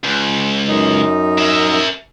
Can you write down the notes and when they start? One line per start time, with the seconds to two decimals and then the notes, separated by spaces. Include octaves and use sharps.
0.03 C#2
0.68 F#2 D#4
1.38 A#4 E5